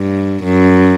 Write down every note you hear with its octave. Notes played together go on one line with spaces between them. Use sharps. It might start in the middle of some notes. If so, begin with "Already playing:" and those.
Already playing: G2
F#2